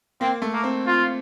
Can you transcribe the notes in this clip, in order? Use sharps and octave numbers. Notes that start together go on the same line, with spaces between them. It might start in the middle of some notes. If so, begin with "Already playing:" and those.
A#3 C4
A3
A#3
C4
F4